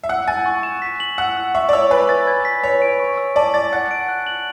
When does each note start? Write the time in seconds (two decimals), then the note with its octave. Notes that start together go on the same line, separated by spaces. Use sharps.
0.04 E5
0.09 F#5 E6
0.28 G#5 A6
0.46 C#6
0.63 E7
0.82 B6
1.00 F#7
1.18 F#5 E6
1.36 E6
1.55 E5 C#6
1.69 D5
1.73 C#5 E6
1.91 B4 G#5
2.09 A6
2.27 G#6
2.45 B6
2.63 C#5 E6
2.82 D7
3.00 C#6
3.18 E6
3.36 D5 A5
3.54 D5 A6
3.72 F#5 A6
3.91 D7
4.08 F#6
4.27 F#7